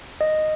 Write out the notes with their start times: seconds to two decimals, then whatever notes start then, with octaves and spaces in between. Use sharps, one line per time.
0.21 D#5